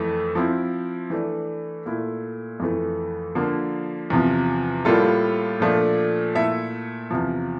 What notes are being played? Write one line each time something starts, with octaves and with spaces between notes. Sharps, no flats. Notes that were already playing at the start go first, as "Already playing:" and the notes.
Already playing: F2 E3 A3
F3 C4 E4
E3 A3 D4
A#2 A3 E4
F2 E3 A3
D3 F3 A#3
E2 C3 F3
A2 G3 A#3 F4 A4
A#2 F3 A3 D4
A#2 A3 E4 A4 E5
E2 C3 F3